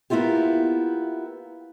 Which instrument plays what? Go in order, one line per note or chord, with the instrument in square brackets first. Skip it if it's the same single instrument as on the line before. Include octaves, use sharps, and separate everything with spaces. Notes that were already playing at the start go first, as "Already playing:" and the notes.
[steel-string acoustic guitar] A#3 B3 E4 F4 G4